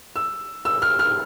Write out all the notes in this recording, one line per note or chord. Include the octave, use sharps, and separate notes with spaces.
E6
E6
F6
F6